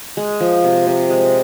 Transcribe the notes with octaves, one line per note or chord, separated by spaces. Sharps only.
G#3
F3
C3
C3
G#3